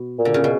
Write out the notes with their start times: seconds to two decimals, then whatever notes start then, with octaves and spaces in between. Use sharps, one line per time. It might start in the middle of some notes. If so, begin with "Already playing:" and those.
Already playing: B2
0.19 A#2
0.25 D3
0.34 C#3
0.44 B2